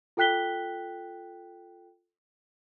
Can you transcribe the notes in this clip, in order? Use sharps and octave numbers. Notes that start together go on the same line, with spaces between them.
F4 A4 G5 F#6 B6 G7